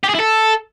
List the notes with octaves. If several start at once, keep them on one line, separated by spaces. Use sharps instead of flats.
G4
G#4
E4
A4